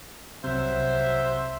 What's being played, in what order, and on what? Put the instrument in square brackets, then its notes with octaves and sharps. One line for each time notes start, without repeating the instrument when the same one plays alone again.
[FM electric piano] C2 C3 [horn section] F#3 E5 [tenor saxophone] C5